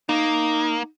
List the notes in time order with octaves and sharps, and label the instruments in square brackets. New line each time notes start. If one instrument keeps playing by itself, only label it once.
[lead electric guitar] A#3 [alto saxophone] D#4